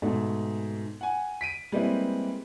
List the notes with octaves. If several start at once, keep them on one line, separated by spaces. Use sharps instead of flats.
G#2 B2 A3
F#5 G#5
B6 D7 D#7
G3 G#3 A#3 C4 E4 B4